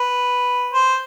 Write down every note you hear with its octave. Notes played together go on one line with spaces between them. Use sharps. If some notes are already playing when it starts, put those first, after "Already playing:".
Already playing: B4
C5